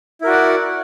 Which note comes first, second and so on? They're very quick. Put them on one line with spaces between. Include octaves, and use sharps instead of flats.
E4 A#4 F#4 D5 F#5